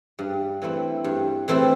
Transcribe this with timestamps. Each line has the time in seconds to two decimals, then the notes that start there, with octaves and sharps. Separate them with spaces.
0.19 G2
0.62 E3 A3 C4 E4
1.04 G2
1.48 E3 A3 C4 E4